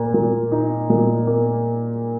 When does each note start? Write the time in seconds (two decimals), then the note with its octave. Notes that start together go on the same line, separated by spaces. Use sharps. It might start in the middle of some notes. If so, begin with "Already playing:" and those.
Already playing: A#2 A#3
0.14 A#2
0.52 D#4
0.90 A#2
1.27 A#3